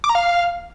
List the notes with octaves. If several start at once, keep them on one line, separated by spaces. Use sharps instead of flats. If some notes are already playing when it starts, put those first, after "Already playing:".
D6
A#5
F5